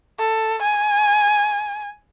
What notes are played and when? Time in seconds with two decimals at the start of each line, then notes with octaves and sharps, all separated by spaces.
0.19 A4
0.62 G#5